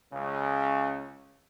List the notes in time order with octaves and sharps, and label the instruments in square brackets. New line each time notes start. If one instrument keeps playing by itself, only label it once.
[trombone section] C#2 C#3